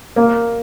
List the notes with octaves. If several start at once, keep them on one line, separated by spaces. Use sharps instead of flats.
A#3